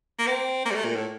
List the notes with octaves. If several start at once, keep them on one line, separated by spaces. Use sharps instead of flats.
A#3
C4
A#3
G3
A3
A#2
A2